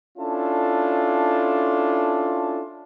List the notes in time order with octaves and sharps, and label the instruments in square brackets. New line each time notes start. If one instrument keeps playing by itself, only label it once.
[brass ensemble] C#4 D4 E4 F4 A4 A5